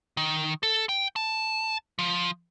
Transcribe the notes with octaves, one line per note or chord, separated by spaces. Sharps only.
D#3
A4
G5
A5
F3